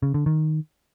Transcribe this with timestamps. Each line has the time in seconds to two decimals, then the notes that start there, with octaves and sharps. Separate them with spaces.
0.03 C#3
0.14 D3
0.26 D#3